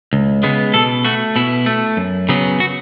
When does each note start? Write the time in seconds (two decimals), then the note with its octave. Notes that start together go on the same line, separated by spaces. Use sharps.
0.13 C#2
0.43 C#3 G#3 B3
0.74 B2 A4
1.05 A3 F#4
1.36 B2 E4
1.66 A3
1.97 F#2
2.29 C#3 F#3 B3
2.60 F#4